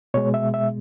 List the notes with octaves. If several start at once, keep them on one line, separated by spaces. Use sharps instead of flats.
B2 G#3 C#5
E5
E5